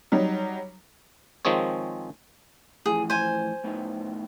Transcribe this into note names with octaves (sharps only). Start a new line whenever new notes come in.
F#3 G3 D#4
D#3 F3 G#3 C4 G#4 C#5
A2 E3 F3 G#4
C5 G#5
A2 B3 D#4